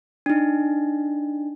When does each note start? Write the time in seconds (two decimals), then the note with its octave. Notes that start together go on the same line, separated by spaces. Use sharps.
0.26 D4 D#4